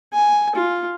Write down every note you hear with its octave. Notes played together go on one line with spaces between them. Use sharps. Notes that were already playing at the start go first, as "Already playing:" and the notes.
G#5
F4